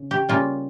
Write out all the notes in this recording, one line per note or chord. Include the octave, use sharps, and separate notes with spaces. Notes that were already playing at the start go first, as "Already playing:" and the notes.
Already playing: C#3
G4
C#3 G3 A#3 F4